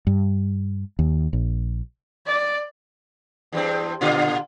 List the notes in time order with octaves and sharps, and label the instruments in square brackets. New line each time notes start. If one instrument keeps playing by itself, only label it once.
[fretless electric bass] G2
D#2
A#1
[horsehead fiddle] D5
[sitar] E2 G2 C4
A#2 D3 F4